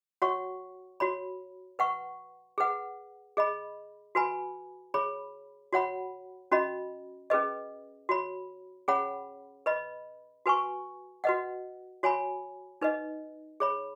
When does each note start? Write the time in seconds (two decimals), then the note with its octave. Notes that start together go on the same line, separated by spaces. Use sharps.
0.22 F#4 C#5 F#5 C#6
1.00 F#4 C#5 B5
1.79 B4 F#5 C#6
2.58 G#4 B4 F#5
3.37 G#4 D#5 B5
4.15 F#4 B4 G#5 B5
4.94 G#4 C#5 B5
5.73 F#4 C#5 F#5 B5
6.52 C#4 F#4 D#5 B5
7.30 C#4 G#4 B4 D#5
8.09 F#4 C#5 B5
8.88 C#4 G#4 C#5 F#5 B5
9.66 B4 D#5 B5
10.46 F#4 B4 G#5 C#6
11.24 F#4 B4 D#5 F#5
12.03 F#4 C#5 G#5 B5
12.81 D#4 B4 D#5
13.60 G#4 C#5 B5